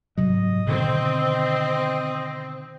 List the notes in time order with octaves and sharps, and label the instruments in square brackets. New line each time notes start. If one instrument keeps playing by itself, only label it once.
[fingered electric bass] G#2 C3 F#3 [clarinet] D#5
[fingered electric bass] B2 D3 D#3 [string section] C4